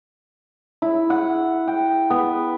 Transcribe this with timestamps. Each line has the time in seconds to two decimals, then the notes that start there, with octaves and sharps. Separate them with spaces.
0.82 E4
1.10 F#5
1.68 G5
2.10 B3